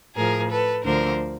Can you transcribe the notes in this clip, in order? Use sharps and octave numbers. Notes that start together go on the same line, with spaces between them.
A2 F3 G#4 A#4
A4 B4
D2 D3 F3 A#4 C5